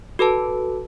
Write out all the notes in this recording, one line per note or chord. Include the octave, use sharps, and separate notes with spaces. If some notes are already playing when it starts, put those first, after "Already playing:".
F#4 A4 B4 A5